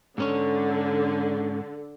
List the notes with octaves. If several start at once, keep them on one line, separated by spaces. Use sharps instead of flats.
G#2 D3 C#4 C#5